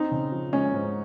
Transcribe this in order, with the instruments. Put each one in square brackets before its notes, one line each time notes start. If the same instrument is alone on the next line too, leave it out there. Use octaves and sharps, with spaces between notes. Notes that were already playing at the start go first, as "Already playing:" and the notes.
Already playing: [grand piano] C4 [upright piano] D#4
[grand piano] C#3
F3
[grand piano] G#3 [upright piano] C#4
[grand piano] G#2